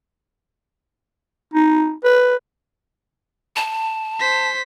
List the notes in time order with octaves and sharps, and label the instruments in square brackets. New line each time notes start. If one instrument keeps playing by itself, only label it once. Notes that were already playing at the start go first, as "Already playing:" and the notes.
[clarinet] D#4
B4
[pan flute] A5
[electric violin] C5 B6